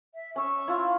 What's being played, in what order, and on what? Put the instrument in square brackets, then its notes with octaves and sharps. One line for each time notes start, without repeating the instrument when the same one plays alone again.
[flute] E5
[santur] C#4 E5 [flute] C#6
[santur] E4 F4